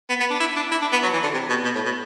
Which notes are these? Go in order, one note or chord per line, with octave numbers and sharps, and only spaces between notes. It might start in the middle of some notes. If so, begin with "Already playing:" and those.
B3
B3
D4
E4
D4
E4
D4
B3
F#3
E3
D3
C3
B2
B2
A2
B2